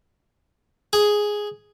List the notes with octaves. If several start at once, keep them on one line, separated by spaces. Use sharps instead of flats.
G#4